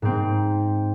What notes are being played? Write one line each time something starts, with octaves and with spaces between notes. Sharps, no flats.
G#2 C4